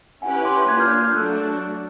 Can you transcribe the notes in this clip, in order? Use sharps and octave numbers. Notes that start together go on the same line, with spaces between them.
C#4 E4 G4 B4 F#5 G#5
C6 D6
A#3 D4 F4 F#6 G#6
F6 G6
F#6 G#6
F6 G6
F#3 A3 D4 F#4 E6 F#6